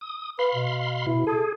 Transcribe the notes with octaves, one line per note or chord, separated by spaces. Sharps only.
D#6
B4 F5 B5 C6
B2
B2 E4
G#4 A4